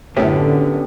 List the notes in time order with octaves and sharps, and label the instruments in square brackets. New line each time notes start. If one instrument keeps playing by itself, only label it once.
[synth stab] F#2 A2 [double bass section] D3 [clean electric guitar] B3 C#4 G4